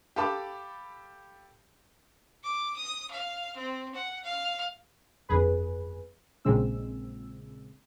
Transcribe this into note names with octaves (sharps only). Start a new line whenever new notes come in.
G4 A4 F5 A5 B5 D6
D6
D#6
F5
C4
F#5
F5
G1 F2 G#4 B4
A#1 A#2 C#3 G#3 C4 E6